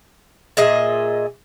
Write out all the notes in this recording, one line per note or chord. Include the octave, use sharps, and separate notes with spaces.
A#2 G#4 D#5 E5